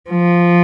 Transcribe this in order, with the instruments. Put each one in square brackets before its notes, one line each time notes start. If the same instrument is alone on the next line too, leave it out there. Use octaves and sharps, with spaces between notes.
[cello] F3